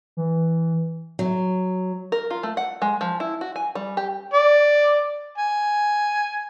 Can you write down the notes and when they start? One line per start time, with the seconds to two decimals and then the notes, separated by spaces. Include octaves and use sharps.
0.17 E3
1.19 F#3
2.12 A#4
2.30 F4
2.43 A3
2.57 F#5
2.82 G#3
3.01 F3
3.20 E4
3.41 F#4
3.56 G#5
3.75 G3
3.97 G4
4.33 D5
5.38 G#5